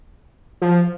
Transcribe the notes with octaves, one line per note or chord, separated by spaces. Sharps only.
F3